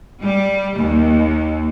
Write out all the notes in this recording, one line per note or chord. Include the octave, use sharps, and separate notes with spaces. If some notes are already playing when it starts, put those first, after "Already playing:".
G3
D#2